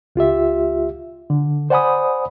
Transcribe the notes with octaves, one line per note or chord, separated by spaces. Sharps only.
C#2 F4 G4 E5
D3
C5 D5 F#5 G#5 B5 D#6